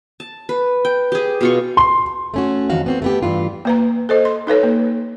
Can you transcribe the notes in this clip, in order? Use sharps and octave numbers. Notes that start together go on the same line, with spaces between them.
A5
B4
G5
G4 G#4
B2 F4 C#6
C6
A3 C#4 F#4
F2 D#3 F3 F#4 F5
B3 C4 F#4
A3 B3 G4
G2 E3 F4
A#3 B4 A#5
A4 C5 D#5
C6
D#4 A4 B4 C#5
A#3